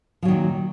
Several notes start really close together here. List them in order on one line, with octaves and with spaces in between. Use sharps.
F3 F#3 D#3 A#2